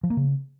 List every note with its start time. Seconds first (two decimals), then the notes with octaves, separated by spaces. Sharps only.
0.03 F3
0.10 A#3
0.17 C#3